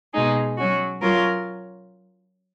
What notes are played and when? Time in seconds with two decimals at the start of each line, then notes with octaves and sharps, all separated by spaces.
0.13 B2 G#3 D#4 G#4
0.57 F#3 C#4 F#4
1.01 F#3 C#4 F4 A#4